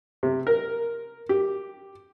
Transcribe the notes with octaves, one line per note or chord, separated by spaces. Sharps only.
C3
A#4
G4